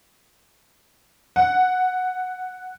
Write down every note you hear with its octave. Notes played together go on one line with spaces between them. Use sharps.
F#5